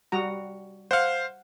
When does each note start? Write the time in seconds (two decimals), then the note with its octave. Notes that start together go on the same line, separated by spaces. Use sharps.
0.12 G3 F#4 A#5
0.91 C5 F5 F#5